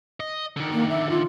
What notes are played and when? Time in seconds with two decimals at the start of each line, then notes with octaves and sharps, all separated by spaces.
0.20 D#5
0.56 D3 D#3
0.73 A#3
0.89 E5
1.10 F4